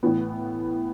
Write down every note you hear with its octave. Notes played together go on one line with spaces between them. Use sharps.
A2 E3 B3